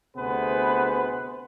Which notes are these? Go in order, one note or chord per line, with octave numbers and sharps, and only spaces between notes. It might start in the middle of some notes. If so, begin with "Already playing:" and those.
D2 C3 B3 G#4 B4 C5